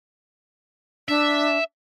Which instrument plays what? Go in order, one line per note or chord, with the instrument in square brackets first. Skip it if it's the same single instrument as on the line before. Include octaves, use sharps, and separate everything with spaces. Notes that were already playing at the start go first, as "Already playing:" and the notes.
[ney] D4 [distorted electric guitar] E5